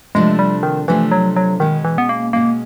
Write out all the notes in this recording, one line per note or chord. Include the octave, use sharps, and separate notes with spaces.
C3 F3 G#3 A3 D4
G3
D#3
C3 E3 F3 A3 D4
F#3
F#3
B2 D#3 G#3 C#4
E3
B3
A#3
B2 G#3 A#3 C#4